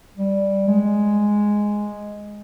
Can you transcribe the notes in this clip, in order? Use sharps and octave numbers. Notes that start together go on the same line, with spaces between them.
G3
G#3